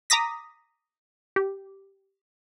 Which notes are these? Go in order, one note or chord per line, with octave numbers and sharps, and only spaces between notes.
A#5 D6 D#6 A#6 B6
G4